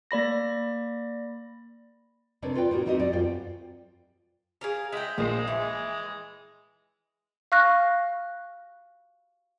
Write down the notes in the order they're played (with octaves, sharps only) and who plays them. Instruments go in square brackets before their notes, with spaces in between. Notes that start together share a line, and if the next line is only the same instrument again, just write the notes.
[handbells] A#3 D5 B5 A#6
[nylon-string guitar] C3 D4 A#4 B4 C#5
F4 B4 D5 G5
A2 D#4 F#4 A#4
B3 C4 D#4 F#4 G4 D#5
B2 G3 D5
F#2 F4 C5 G5
[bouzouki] G#4 A#4 F5
[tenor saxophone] G#3 [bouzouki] E5 G5
[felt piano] A#1 A#3 C7 [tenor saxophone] G#3 [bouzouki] C5
[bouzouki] E3 [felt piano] E5
[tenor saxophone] G#3
[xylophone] F5 C#6 F6 F#6 A#6